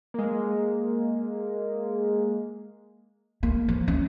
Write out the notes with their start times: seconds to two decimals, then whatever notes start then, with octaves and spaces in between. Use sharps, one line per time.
0.14 G#3 A#3
3.43 A#3
3.69 F3
3.88 C#4